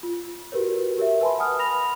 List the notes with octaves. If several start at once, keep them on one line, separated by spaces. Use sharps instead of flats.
F4
F#4 G4 A#4 B4 C#5
G4 A#4 C#5 E5
B4 G#5 A5 B5 C6
F#5 G#5 A5 D#6 F6
B5 A#6 F7